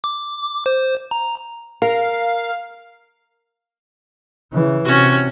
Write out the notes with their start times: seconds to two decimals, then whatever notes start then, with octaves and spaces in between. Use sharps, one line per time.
0.04 D6
0.66 C5
1.11 A#5
1.82 A#4 F5
4.53 C#3 E3
4.85 C3 C#4 F#4